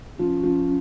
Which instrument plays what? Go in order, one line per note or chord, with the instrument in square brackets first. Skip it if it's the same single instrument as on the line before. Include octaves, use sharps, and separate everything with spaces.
[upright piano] F3 [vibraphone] C#4
[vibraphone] C#4
[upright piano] F3
[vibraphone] C#4